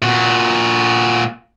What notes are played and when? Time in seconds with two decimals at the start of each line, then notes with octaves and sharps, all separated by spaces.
0.02 A#2 F#4